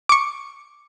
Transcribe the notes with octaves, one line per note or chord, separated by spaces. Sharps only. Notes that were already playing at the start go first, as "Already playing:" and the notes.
C#6 D6